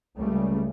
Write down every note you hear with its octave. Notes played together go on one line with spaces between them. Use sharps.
C#2 C#3 G3 A3